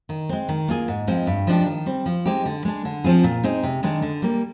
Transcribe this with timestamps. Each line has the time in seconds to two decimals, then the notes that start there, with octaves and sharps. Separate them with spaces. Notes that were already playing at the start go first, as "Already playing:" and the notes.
0.09 D#3
0.29 G#3 C4
0.49 D#3
0.68 A#3 F4 G#4
0.88 G#2
1.07 F3 G#3 C4
1.27 G2
1.47 F3 G#3 D4 G4
1.66 D#3
1.86 G3 C4
2.06 F3
2.26 G#3 C4 D#4 G4
2.45 D3
2.65 G#3 D4
2.85 D3
3.04 F3 C4 F4 G#4
3.24 A#2
3.43 G#3 C4 D#4 G#4
3.63 C3
3.83 D#3 G#3 D4
4.02 D3
4.22 G3 A#3